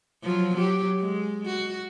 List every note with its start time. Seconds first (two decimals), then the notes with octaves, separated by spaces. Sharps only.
0.23 F3 F#3
0.57 F#3 G4
1.00 G#3
1.46 F#4